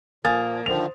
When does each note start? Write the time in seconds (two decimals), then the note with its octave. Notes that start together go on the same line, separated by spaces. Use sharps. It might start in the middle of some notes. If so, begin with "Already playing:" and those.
0.25 A#2 F3 A#3 G#5 D#6 A6
0.66 D3 D#3 F3 C5 F7